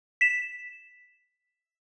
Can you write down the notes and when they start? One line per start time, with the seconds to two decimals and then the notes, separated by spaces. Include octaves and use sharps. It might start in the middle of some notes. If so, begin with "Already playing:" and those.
0.21 B6 E7